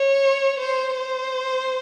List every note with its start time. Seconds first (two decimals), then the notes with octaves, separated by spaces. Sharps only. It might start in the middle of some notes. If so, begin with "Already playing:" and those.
Already playing: C#5
0.59 C5
0.97 C5